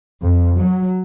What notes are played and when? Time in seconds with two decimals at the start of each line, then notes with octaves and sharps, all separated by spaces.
0.22 F2
0.57 F#3